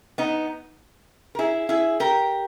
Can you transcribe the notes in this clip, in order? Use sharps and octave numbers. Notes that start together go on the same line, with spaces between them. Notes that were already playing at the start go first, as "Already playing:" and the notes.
B3 D#4
A#4
E4 G#4
E4 G#4
G4 A#4